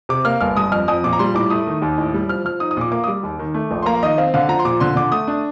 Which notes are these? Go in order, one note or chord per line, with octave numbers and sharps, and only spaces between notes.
C3 D6
A#3 F6
G1 F6
G2 D#6
F2 F6
F2 D#6
A#2 D6
A#5
G3 C6
A2 D6
A3 D#6
D#3
D#2
A2
G3
F3 F6
F3 F6
D#4 D#6
D#6
A#2 D6
A#3 D6
D#6
G3 D6
D#2
D#3
A3
A#1
C6
A#3 A#5
F5
D#3 D#5
C4 F5
D3 F5
F3 A#5
C6
A#2 D6
D3 C6
D3 D6
A3 D#6
D4